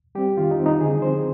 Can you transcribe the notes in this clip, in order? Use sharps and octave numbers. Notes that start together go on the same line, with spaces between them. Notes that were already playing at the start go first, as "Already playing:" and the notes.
G3 C4 G4
D#3 F4
D#4
G3 C4
D#4
D3 G#4
F3 C4 C5